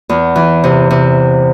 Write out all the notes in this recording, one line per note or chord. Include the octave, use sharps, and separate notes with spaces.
E2
E3
C3
C3